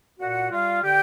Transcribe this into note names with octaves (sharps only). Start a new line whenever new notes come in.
A#2 F#4 F#5
G3 F4 F5
D3 G4 G5